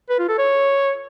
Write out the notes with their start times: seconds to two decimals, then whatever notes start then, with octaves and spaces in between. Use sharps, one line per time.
0.09 B4
0.19 F4
0.29 A4
0.38 C#5